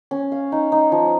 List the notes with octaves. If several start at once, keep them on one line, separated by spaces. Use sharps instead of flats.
C#4
F5
D#4
D#4
F3